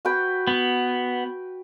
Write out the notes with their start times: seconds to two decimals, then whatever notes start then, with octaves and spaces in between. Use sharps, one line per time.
0.05 F#4 B4 G5
0.47 B3